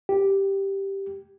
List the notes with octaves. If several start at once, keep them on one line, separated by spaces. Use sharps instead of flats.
G4